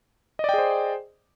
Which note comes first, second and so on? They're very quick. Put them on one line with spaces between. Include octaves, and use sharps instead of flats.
D#5 D5 G5 G#4 C5